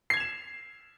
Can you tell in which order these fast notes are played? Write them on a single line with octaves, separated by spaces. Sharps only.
C7 G#6 F7 E7